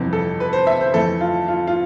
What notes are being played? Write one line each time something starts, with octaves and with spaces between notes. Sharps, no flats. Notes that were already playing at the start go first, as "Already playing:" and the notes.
Already playing: G1 F2 C3 E3
A4
B4
C5
E5
C5
F2 E3 A3 E4 A4
F4
F4
F4